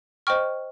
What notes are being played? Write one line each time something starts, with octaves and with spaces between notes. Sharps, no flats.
C5 D#5 G5 C#6 F6